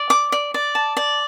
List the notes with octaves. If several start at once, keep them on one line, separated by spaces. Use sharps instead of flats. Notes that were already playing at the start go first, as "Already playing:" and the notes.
Already playing: D5
D6
D5
D5
A5
D5